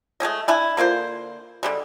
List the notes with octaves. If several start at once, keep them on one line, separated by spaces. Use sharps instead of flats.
G#3 A3 C#4 D#5
D4 E4 G#5
D3 A#3 F4 C5
D3 G3 G#3